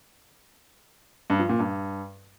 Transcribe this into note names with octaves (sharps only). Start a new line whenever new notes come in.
G2
F3
A#2
G2